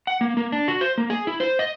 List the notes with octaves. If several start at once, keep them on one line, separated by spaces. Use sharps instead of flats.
F#5
A#3
A#3
D4
F#4
C5
A#3
G#4
E4
C5
D#5